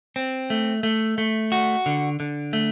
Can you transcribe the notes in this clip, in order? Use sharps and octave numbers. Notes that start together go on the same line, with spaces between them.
C4
A3
A3
A3
F#4
D3
D3
A3